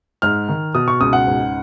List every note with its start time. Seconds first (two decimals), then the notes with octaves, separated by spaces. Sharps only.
0.22 G#2 F6
0.49 D#3
0.74 B2 D#6
0.88 C#6
1.01 C#2 D#6
1.13 F#5
1.27 G#2